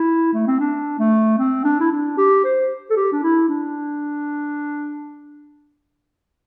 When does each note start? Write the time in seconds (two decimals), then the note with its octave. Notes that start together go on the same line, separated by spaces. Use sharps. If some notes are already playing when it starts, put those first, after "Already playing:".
Already playing: E4
0.34 A3
0.47 C4
0.60 D4
0.99 A3
1.39 C4
1.65 D4
1.80 E4
1.91 D4
2.18 G4
2.44 C5
2.90 A4
2.97 G4
3.12 D4
3.23 E4
3.49 D4